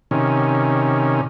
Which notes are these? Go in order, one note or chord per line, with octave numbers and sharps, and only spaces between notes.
C3 D#3 C#4